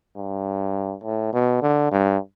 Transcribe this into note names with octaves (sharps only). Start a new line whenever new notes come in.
G2
A2
B2
D3
G2